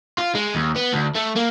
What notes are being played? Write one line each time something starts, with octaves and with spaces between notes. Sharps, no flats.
F4
G#3
D#2
B3
D2
A3
A#3